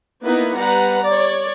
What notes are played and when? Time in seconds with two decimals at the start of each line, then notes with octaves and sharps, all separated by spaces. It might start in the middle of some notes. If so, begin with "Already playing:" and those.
0.24 A#3 B3 D#4 E4 B4
0.56 G3 B4 F#5 A#5
1.05 C#5 D5